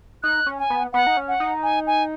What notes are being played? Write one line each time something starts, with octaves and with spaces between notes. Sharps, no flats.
D#4 F#6
C#4
G#5
B3
B3 F#5
D#4
C#4
F#5
D#4
G#5
G#5